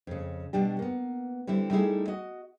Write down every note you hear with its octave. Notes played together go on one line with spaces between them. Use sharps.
F2 C#3
B2 G3 D4 G4
A#3 B3
D3 G3 C4 E4
G3 A3 D#4 E4 G4 G#4
F#4 D#5